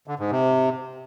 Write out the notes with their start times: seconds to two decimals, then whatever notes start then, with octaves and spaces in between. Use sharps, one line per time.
0.07 D3
0.19 G#2
0.31 C3